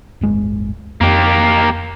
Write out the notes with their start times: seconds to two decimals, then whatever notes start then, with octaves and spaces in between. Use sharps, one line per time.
0.21 D1 G1 G#3
1.01 F2 A#3 G4